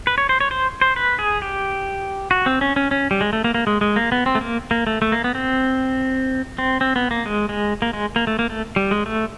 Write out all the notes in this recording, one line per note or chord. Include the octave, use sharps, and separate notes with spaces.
B4
C#5
C5
C#5
C5
C5
B4
G#4
G4
F#4
C4
C#4
C#4
C#4
G3
G#3
A3
A#3
A#3
G#3
G#3
A#3
B3
C4
A3
A#3
A#3
A3
A3
A#3
B3
C4
C4
C4
B3
A#3
G#3
G#3
A#3
G#3
A#3
A3
A#3
A3
G3
G#3
A3